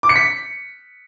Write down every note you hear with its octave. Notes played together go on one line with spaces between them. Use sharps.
D6
C#7
B6